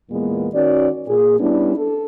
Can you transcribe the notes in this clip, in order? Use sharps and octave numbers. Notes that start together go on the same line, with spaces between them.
E2 A#2 G#3 A#3 B3
D#3 C#4 F#4 D5
A#2 G#4
G3 B3 C#4 D4 E4
A4